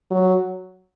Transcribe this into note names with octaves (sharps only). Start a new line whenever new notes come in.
F#3